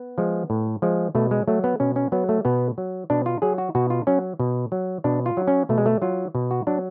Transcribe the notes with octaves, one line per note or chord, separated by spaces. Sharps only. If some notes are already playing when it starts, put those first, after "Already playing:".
Already playing: B3
F3 G#3
A2
F3 G#3
B2 A3
G#3
F#3 A3
B3
B2 C#4
C#4
F#3 B3
A3
B2 B3
F#3
B2 D4
F4
F#3 G#4
F#4
B2 F#4
F4
F#3 C#4
B2
F#3
B2 D4
F4
F#3
C#4
B2 A3
G#3
A3
F#3 F4
B2
F#4
F#3 D4